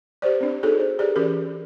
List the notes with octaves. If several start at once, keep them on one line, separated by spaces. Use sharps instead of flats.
G4 B4 C5 D5
C4 D4
D#4 F#4 G#4 A4 C#5
C5
G4 G#4 B4 D5
E3 C#4 F#4 G4 A#4